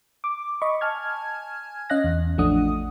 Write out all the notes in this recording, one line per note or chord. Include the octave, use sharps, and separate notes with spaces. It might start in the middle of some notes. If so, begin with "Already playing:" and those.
D6
D#5 B5 C#6 D6
G#5 A5 F6 G#6
C#4 D#5 F5 F#6 A#6
E2
A1 F3 A3 D4 F#5 D#6